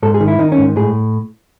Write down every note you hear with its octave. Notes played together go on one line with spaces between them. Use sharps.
G#2 A4
G#4
D#3
E4
D#3 D#4
C#4
G#2
A2 G#4